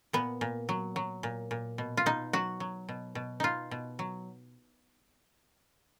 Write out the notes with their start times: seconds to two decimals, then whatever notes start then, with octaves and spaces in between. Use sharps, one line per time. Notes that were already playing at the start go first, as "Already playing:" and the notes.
0.13 A#2 B3
0.41 A#2
0.69 F#3
0.96 F#3
1.23 A#2
1.51 A#2
1.78 B2
1.97 F4
2.06 B2 D#4
2.33 F#3 F#4
2.60 F#3
2.89 B2
3.15 B2
3.40 B2 D#4 F4
3.71 B2
3.99 F#3